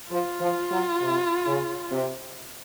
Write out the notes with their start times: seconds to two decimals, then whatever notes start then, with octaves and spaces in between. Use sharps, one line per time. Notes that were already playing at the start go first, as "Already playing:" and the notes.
0.10 F3 F4
0.40 F3
0.71 F#3
1.01 C3
1.46 C#3
1.91 C3